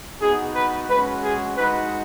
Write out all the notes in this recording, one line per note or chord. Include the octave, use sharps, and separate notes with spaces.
B3 D#4 F#4 G#4
B4
G#3 C#4 F#4 B4
G#4
G#3 D#4 F#4 B4